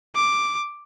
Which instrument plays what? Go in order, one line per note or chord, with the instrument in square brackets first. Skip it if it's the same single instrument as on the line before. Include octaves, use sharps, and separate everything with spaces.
[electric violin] D6